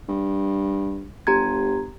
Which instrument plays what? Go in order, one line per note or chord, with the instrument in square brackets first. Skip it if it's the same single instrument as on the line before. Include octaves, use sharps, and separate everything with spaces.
[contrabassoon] G2
[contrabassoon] G1 [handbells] G4 A#5 G#6